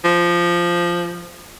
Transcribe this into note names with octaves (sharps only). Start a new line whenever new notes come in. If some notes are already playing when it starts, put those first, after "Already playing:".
F3